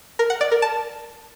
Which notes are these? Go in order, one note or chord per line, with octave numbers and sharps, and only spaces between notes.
A#4
F#5
D5
A#4
A5